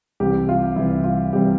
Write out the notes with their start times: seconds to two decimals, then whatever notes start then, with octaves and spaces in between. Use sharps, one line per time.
0.20 C2 C3 E3 G3 G4
0.49 F4
0.76 C2 C3 E3 G3 E4
1.04 F4
1.33 C2 C3 E3 G3 G4